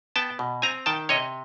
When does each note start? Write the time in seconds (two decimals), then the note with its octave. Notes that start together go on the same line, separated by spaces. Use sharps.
0.16 B3 G5 A5
0.39 B2
0.62 C4 G#5 A#5
0.86 D#3 G5 A5
1.09 C3 C#5 D#5